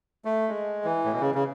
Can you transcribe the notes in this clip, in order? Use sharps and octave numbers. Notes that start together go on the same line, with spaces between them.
A3
G#3
E3
A2
B2
C#3
C#3